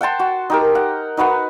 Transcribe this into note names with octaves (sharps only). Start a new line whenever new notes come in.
F#5 G5 A5 C6
F#4
D#4 G4 A#4
F#5
D#4 F#4 B4 F#5